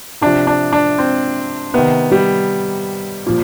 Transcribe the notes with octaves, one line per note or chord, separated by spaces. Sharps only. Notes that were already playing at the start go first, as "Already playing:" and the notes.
C3 F3 D4
D4
D4
C4
C3 D#3 B3
G3
A#2 F3